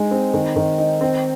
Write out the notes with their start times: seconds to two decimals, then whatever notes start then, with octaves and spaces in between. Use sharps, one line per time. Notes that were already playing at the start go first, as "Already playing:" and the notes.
Already playing: G#3 D#4
0.11 C4
0.34 D#3
0.56 D#3
0.78 D#4
1.01 C4